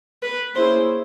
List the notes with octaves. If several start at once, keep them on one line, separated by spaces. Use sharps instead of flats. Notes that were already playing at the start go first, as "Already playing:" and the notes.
B4
A#3 C#4 E4 G#4 C5